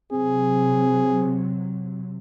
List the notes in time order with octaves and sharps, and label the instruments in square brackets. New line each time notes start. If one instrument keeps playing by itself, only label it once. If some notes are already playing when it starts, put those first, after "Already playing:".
[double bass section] C3 F#3 [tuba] C4 [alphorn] G#4